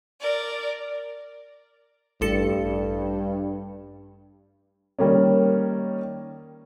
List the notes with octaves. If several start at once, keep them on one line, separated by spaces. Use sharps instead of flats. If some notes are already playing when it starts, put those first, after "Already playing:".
A#4 D5
A1 G2 A4 C#7
D#3 G3 A#3 C#4